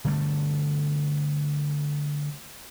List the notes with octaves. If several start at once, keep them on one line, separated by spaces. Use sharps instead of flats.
D3 G3 A3